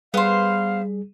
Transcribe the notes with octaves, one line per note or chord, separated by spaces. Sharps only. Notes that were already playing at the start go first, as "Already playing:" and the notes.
G3 B3 G#4 C5 F5